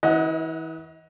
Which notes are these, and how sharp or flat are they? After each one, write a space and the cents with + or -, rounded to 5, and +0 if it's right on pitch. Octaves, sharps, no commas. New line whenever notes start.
E3 -30 D#5 +30 F#5 +0